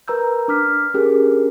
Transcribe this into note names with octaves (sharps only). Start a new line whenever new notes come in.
A#4 B4 A#5 E6 G6
D4 D6 F6 B6
C#4 G4 G#4 A#4